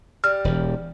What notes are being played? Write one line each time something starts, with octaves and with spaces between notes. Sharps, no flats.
G3 F6
E1 E2